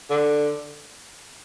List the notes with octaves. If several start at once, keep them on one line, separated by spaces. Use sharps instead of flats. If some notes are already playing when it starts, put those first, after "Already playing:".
D3